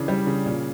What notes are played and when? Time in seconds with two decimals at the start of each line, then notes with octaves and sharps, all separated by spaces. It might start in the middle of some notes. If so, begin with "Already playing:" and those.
Already playing: C#3 E3 D4
0.08 G3
0.27 C#3
0.46 A#2